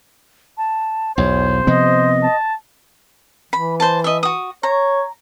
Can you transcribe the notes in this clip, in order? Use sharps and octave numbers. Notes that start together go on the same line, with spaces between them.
A5
B1 E2 C5 C#5
C3 F3 B3 D#5
A5
E3 B5
C5 A5
D#5 E5
F#4 D#6
C#5 A#5